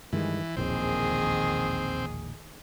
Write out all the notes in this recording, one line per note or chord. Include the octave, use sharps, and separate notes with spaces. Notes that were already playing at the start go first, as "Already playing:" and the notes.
G2 D#3 E3 G#3
E1 A#1 D#2 D#3 C4 G#4